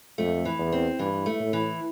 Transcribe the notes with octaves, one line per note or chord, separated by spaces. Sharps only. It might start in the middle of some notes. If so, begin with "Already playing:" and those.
F2 A3
E3
E2
C4
G2 E3
A3
A2
E3